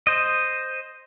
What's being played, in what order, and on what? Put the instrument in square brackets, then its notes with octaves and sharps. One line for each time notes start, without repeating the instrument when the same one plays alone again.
[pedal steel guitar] C5 D#5